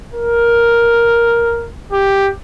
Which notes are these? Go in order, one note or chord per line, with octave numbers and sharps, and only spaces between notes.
A#4
G4